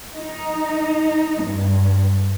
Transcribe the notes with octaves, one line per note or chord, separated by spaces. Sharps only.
D#4
G2